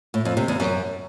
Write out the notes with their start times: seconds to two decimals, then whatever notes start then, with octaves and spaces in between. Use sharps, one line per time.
0.14 A2
0.25 F2
0.37 C3
0.48 E2
0.60 F#2